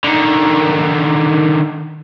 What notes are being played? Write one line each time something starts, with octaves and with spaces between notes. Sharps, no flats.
D3 D#3